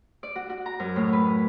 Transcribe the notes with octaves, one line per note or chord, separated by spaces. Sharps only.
D5
F#4
F#4
A#5
F#2
A2
B4